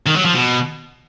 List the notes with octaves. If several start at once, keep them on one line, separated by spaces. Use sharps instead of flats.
D#3
F#3
F3
B2